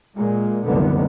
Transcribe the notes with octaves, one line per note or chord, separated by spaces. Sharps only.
A#2 G#3
F1 C2 F#2 D3 D#3 B3